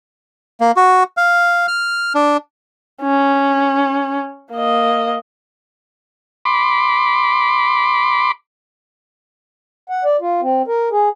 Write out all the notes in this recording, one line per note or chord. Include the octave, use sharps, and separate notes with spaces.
A#3
F#4
F5
F6
D4
C#4
A#3 D#5
B5 C6 D6
F#5
D5
F4
C4
A#4
G#4